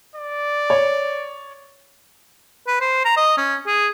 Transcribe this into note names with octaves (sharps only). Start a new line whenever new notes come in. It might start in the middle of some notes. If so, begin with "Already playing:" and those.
D5
C#5
B4
C5
A#5
D#5
C#4
G#4